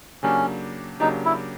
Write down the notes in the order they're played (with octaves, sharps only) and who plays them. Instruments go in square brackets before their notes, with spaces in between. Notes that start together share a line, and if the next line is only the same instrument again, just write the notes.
[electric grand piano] C#3 F#3 A#3 D4 G4 [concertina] C#4
[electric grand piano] C#3 F#3 A#3 D4 G4 [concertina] D#4
[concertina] E4